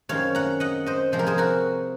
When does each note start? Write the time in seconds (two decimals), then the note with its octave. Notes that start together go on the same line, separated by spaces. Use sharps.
0.09 F#2 D#3 G#3 C4 C#5 F5
0.35 F#5 A#5
0.60 D#5 F#5
0.86 C5 D#5
1.12 C3 F3 G#3 C4 C5
1.19 A#4
1.27 G#4 C5
1.38 F#4 A#4